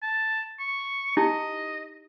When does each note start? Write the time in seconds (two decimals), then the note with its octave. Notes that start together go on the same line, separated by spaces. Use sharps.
0.03 A5
0.60 C#6
1.17 D#4 E4 G4 D#5